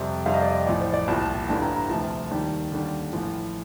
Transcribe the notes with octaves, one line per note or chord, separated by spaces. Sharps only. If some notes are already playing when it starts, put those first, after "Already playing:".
Already playing: F2 C3 G3 D5
F2 C3 G3 F5
D#5
D5
D#5
A1 A2 F3 D5
C5
D5
C2 A#2 F3 A5
A5
A5
A1 G2 D3 G3 A5
A#5
A#5
D2 C3 F3 A5
D#2 D#3 G3 A5
D#2 D3 G3
A1 A2 F3